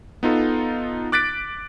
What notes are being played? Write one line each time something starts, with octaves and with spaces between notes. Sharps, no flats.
B3 D#4 F4 A4
D6 F#6 A6 B6 D7